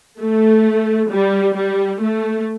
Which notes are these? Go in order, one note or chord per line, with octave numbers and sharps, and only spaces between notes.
A3
G3
G3
A3